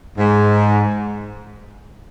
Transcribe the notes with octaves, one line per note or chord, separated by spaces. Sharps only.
G#2